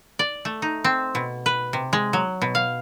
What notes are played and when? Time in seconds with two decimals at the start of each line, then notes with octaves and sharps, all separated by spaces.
0.19 D5
0.45 A3
0.62 D#4
0.84 C4
1.15 B2
1.46 B4
1.73 C3
1.93 G#3
2.13 F#3
2.42 B2
2.55 F5